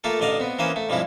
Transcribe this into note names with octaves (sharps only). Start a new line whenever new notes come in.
A3 A#3 F4 A4
A1 D3 D5 D#5 F5
B3 C4
E3 A#3 C#4 C5 D#6
A3
G2 F3 G3 G#3 C4 E4